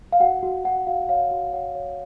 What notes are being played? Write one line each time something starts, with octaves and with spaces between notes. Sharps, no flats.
F5
F#4 F#5
F#4
F#4 F#5
F#4 F5
C#5 F5
F#4
C#5 F#5
C#5